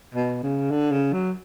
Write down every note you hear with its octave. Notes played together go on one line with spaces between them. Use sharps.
B2
C#3
D3
C#3
F#3